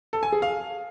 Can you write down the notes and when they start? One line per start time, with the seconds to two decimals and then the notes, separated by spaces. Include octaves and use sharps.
0.13 A4
0.23 G#5
0.32 G#4
0.42 F5